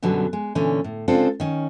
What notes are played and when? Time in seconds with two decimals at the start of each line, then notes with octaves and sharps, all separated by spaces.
0.03 F#2 B2 D3 F#3 G3
0.33 G#3
0.55 A#2 D3 E3 C#4
0.84 A2
1.08 C#3 G#3 C4 D4 F4 A4
1.40 D#3 C#4